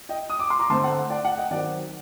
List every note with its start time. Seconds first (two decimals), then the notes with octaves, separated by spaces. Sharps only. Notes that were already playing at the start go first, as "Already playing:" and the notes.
0.09 D#5 G5
0.30 D#6
0.39 D6
0.50 C6
0.59 A#5 D6
0.70 D3 A3 C4 A5 C6
0.84 F#5 A5
1.10 D5 F#5
1.24 F#5 A5
1.38 D#5 G5
1.51 D#3 F#3 C4 D5 F#5